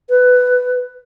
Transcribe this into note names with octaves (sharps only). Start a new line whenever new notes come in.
B4